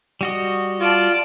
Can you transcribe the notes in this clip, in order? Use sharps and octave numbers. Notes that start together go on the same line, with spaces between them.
G3 F#4 D#5
F4 D5 A5